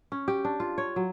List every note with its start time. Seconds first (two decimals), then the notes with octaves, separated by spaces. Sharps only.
0.12 C#4
0.28 G4
0.45 D4
0.60 F4
0.78 C#5
0.96 F#3